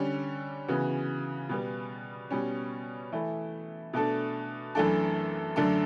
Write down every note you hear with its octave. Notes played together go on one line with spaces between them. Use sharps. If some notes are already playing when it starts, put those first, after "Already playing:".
Already playing: D3 G3 C#4
C#3 E3 B3 F#4
B2 G3 B3
B2 G3 C#4
E3 A3 E4
B2 A3 D4 A4
F#2 E3 A3 D4 A4
F#2 D3 A3 D4 A4